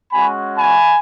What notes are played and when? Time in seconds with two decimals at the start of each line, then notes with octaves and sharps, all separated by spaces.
0.12 G#3 C#4 F#4 G#5 B5
0.58 G#5 B5